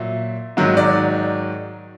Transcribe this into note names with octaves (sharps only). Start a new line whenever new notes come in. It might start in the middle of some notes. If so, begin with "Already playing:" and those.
Already playing: A#2 F#3 E5
G#2 D#3 F#3
D5